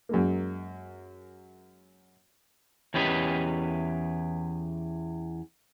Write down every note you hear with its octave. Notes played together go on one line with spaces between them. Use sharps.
F#2 G#3 A#3
E2 C#4 G4 B4 D#5